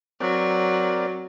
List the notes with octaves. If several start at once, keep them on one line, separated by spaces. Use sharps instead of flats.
F#3 C4 A#4 D5